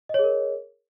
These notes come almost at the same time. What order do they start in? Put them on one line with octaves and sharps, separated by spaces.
D#5 C#5 G#4 A#4